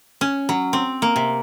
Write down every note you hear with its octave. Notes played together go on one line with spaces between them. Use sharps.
C#4
F#3
C4
A#3
C3